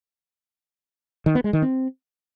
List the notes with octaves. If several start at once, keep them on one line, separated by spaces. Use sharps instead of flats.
D#3
B3
G#3
D#3
C4